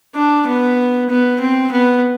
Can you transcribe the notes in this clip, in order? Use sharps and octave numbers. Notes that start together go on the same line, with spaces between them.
D4
B3
B3
C4
B3